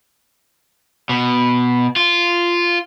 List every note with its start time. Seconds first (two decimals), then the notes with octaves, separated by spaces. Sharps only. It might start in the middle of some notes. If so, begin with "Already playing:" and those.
1.09 B2
1.96 F4